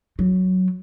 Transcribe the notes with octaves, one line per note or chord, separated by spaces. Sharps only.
F#3